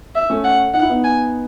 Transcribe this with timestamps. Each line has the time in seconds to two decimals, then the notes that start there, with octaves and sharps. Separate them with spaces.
0.15 E5
0.30 A3 C#4
0.44 F#5
0.74 D#4 F#5
0.82 E4
0.89 B3 D#4
1.04 G#5